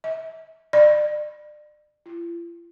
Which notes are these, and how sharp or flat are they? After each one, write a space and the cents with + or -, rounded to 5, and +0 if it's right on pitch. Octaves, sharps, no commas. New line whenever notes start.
E5 -35
D5 +35
F4 -45